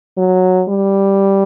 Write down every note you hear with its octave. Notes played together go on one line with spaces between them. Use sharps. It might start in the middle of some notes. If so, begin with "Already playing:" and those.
F#3
G3